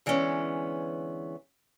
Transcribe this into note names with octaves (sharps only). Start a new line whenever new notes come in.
D3 E3 G#3 B3 C#4